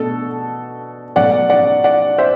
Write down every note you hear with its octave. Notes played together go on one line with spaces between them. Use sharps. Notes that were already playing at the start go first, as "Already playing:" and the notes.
Already playing: B2 A3 D4 A4
B2 F#3 A3 D5 F#5
D5 F#5
D5 F#5
C5 E5